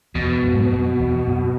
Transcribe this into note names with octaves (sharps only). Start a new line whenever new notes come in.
E2 B2
F#2
G#2
F#2
F#2
E2
F#2